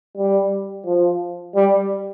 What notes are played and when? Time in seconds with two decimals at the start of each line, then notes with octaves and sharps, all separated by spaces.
0.17 G3
0.86 F3
1.56 G3